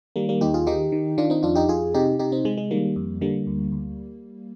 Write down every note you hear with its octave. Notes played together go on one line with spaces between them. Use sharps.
D#3 G3 A#3
G3 A#3
D#2 D#4 G4
F4 G#4
D#3 D#4 G4
D#3
D#3 D4 F4
C4 D#4
F2 D4 F4
D#4 G4
F2 F4 G#4
C3 D#4 G4
C3 D#4 G4
C4 D#4
C3 G#3
G#3
D#3 G3 A#3
F2
D3 G3 A#3
D2
D2